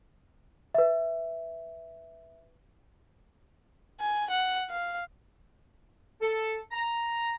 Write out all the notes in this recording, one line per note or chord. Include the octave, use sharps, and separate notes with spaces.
B4 E5
G#5
F#5
F5
A4
A#5